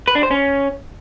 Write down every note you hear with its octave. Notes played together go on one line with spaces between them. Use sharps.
B4
D4
C5
C#4